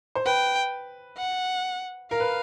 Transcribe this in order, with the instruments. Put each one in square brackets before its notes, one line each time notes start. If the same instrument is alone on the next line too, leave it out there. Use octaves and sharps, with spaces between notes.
[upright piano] C5
[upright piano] B4 [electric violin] G5
[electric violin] F#5
[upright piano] A#4 [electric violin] F5
[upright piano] B4